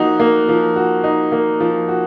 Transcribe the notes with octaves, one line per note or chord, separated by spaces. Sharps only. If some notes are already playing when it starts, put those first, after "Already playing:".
Already playing: F3 A#3 D#4 F#4
A#3
F3
F#4
D#4
A#3
F3
F#4